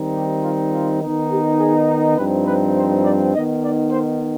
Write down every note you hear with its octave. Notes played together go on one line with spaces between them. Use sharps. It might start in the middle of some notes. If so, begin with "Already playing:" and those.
Already playing: D#3 G3 C4 D#4
G4
F4
F4
D#3 B3 D#4
G4
G#4
G2 F3 C4 D#4 B4
B4
C5
D5
D#3 B3 D#4 D#5
D5
C5